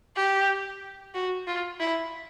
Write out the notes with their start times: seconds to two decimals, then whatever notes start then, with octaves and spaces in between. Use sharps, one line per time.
0.16 G4
1.15 F#4
1.47 F4
1.80 E4